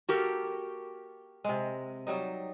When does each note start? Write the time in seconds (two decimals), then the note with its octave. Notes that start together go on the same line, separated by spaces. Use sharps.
0.09 A#3 F#4 G4 A4 A#4
1.44 C3 G#3
2.07 F#3 G3 D#4